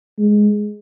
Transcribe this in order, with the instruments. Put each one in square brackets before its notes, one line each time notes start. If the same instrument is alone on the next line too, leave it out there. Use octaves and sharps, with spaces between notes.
[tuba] G#3